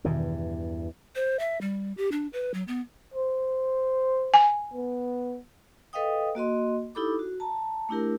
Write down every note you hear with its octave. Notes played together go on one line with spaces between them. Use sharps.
E2 G2 B2 D#3 E3
C5
E5
G3
G4
D4
B4
F#3
B3
C5
G#5
B3
A4 B4 D#5 F5 G5 D#6
A#3 F#4 D#5 C6
D#4 E4 G4 A4 B5 D6
F#4
A5 A#5
A3 D4 E4 G4 A#4